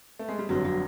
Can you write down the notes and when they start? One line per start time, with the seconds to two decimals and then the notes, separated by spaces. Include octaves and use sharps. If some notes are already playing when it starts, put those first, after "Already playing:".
0.19 A3
0.29 G#3
0.39 G3
0.49 G1 F2 D3 F3 F#3
0.65 F#3